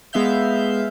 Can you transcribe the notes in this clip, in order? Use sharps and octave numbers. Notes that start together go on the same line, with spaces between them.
G#3 B3 E5 F5 G6